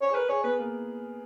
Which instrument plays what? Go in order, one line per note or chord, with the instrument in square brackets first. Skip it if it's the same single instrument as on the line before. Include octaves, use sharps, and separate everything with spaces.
[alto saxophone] C#5
[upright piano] G#4
[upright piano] A#4 [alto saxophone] B4
[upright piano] G#4 [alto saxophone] C#5
[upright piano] B3 [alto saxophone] B4
[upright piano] A#3